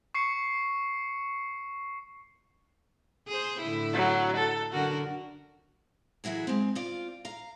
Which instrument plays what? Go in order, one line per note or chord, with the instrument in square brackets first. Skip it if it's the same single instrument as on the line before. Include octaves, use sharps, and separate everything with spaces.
[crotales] C#6 C7 C#7
[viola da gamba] G#4 C5
A2 D3 E4
[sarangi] F#3
A4
[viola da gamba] F#2 D3 A#4 [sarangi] F#4
[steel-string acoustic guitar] E3 F#3 E4 F#4 G#4
G#3 C4
C4 F4 D5
F5 A#5